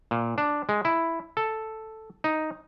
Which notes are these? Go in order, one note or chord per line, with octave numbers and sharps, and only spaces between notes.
A#2
D4
G#3
E4
A4
D#4